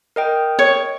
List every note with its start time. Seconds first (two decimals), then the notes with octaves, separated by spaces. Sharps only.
0.16 A#4 D#5 G5
0.59 C#5